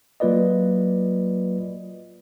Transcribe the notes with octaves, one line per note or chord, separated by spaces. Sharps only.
F#3 A#3 F4 B4 D5 D#5